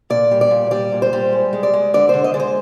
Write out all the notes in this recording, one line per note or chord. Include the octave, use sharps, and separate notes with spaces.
A#2 D5
G3
D5
A#2
G3 D5
A#2
C5
G3
G#3
G#3
D5
G#3
D3 D5
D3 C5
D#5
G#3 D5
C5